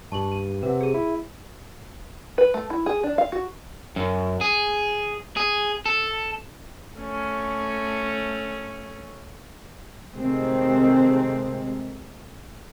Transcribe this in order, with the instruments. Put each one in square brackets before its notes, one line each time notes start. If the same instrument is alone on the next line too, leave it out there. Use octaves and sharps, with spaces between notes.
[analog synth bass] G2 [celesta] A5 C#6 F#7
[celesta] D#7
[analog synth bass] C3 [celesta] B4 F#5
[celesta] G#4 D#7
[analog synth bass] E4
[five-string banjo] B4
A3
E4
G#4
D4
F5
F#4
[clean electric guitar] F#2
G#4
G#4
A4
[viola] A3 C#4
[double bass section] C3 D#3 G#3 A3 C4